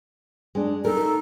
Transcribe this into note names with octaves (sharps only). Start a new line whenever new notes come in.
G#3 D4
D#4 A4 A#4